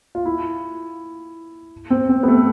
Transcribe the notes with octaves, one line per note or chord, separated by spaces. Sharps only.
F4
E4
C4
C4
B3
A3